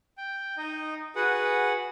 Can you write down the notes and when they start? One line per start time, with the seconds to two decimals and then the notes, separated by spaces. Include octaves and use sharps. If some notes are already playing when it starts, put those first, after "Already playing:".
0.18 G5
0.58 D#4 D#5
1.16 F#4 G#4 B4 F#5